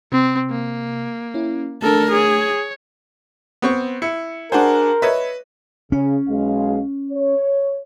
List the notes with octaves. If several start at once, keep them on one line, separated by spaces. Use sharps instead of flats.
C3 C4
A#3
C#4 E4
A3 D4 A4 A#4
G#4 C#5
B3 C4 C#6
E4 C#7
D4 F#4 G#4 A#4 C5
B4 C#5 D#5 E5
C#3 C#4
B1 G#3 F5
C#5